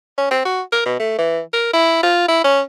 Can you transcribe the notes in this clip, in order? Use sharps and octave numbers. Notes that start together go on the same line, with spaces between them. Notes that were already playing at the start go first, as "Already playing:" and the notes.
C#4
C4
F#4
A#4
B2
A3
E3
A#4
E4
F4
E4
C#4